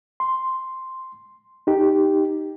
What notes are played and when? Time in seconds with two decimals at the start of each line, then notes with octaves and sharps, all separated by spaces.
0.20 C6
1.67 D#4 G4